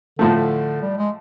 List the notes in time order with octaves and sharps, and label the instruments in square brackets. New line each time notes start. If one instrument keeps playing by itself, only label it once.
[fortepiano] A2 F3 A3 [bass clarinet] D3
[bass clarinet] D3
G3
G#3